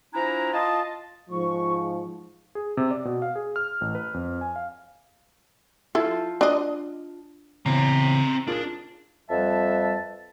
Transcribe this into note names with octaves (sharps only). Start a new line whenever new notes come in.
F3 D4 E4 G#5 A#5
F4 D#5 A5
G#2 F3 C#6
G#4
C3
D5
B2
F5
G#4
F6
A1
B4
F2
G#5
F5
E4 F4 A4 A5
D4 D#5
C#3 E3 B3 C4 A#5
D4 F4 G#4 A#4
F2 G3 B4 E5 A5